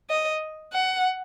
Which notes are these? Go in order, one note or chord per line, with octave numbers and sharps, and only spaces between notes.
D#5
F#5